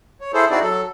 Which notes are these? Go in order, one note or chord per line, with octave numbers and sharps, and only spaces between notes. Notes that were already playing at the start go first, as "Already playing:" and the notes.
C#5
E4 G#4 A4 C5
C4 D#4 E4 F#4 G#4 D5
F#3 A4